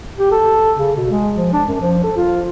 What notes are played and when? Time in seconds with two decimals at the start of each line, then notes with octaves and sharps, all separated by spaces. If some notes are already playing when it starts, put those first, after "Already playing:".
0.19 G4
0.32 A4
0.77 C#3
0.97 B2
1.11 G#3
1.37 F3
1.53 D4
1.68 F#2
1.81 F3
2.04 A4
2.16 F4